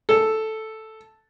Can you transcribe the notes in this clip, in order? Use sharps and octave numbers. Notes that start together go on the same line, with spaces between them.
A4